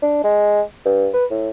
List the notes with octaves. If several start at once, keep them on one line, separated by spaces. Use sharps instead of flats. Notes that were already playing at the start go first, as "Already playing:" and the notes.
D4
G#3
G2
B4
A2